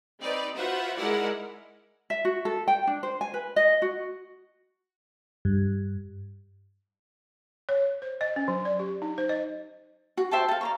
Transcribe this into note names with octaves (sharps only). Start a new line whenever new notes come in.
C4 D#4 B4 D5
F4 F#4 B4 C5 E5 F#5
G#3 D#4 E4 A#4 D5 F#5
E5
F#4
A4
G5
D4
C5
G#5
B4
D#5
F#4
G2
C#5
C5
D#5
C#4
F#3
D5
G4
D#4
C5
D#5
F#4
C5 E5 G5 A5
A4 F5
D5 A#5 C#6